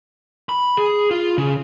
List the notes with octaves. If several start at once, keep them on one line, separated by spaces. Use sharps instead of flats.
B5
G#4
F4
C#3